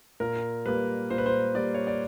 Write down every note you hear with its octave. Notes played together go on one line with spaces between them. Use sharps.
A#2 A#4
G3 A#3 B4
A#2 C5
B4
C5
G3 A#3 D5
C#5
D5